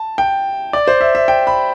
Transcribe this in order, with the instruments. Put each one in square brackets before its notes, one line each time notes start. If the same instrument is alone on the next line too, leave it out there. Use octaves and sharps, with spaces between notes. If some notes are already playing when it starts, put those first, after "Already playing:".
Already playing: [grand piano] A5
G5
D5
C5
E5
E5
G5
B5